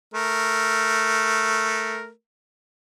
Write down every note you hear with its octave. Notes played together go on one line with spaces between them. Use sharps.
A3 A#4